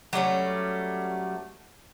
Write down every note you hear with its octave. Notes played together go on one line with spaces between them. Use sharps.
F#3 G3 A3 C#4